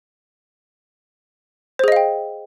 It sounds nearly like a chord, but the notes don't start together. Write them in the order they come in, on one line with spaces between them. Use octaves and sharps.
C5 G#4 D#5 F5 G5